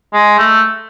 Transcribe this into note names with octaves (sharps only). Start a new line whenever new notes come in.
G#3
A3